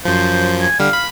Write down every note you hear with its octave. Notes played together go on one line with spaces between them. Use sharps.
F#2 F3 C5
G#5
D3 G3 F5
B5